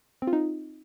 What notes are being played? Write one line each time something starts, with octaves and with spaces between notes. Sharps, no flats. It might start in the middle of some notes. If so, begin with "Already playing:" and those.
C4
F4
D#4